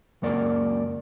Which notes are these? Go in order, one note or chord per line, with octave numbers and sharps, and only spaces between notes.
C#2 F#2 A#3 D5